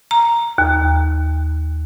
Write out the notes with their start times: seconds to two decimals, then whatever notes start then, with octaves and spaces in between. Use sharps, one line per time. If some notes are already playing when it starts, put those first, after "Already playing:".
0.11 A#5
0.58 D#2